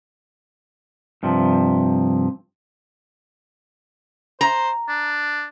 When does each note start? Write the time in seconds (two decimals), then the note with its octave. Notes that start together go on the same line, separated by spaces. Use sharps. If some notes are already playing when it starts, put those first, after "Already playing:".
1.23 G2 C3 F3
4.41 C5 A#5
4.89 D4